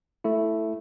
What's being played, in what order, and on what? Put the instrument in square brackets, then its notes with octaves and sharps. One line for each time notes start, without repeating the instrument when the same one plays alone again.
[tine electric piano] A3 E4